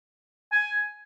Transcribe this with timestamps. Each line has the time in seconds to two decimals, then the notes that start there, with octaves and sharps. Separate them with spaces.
0.52 G#5